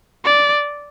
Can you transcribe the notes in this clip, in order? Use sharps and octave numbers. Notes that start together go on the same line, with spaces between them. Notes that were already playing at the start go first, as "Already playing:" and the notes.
D5